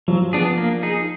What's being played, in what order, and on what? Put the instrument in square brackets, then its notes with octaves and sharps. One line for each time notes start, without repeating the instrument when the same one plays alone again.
[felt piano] F3 [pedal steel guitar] F#3
[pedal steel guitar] B3 D4 G#4
A#3
D#4 G#4